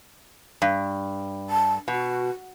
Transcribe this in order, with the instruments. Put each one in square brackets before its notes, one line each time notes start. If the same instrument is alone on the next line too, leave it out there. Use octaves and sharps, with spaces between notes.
[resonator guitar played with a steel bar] G2
[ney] A5
[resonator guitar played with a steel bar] B2 [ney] F#4